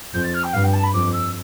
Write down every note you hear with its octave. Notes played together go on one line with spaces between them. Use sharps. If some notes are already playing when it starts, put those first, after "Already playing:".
F2 G6
A6
F6
G5
G2 F5
G5
A5
B5
F2 D6
E6